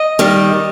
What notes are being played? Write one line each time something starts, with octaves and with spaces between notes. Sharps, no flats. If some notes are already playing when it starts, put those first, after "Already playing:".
Already playing: D#5
D#3 G3